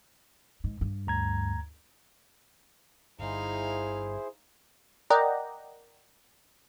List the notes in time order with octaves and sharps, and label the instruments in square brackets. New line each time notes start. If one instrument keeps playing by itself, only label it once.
[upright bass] G#2
G2
[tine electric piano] D2 A#5 G#6
[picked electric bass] G1 G2 [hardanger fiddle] D#4 F5 [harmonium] E4 G#4 C5
[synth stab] A#4 D5 D#5 F#5 G5 A#5